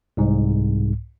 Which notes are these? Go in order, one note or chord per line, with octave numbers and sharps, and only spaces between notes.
C2 G#2